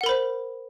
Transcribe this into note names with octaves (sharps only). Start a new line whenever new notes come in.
A#4 C5 F#5 B5